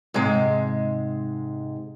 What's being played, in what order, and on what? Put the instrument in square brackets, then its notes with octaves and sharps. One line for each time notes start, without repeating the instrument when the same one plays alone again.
[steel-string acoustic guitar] G#2 C3 G#3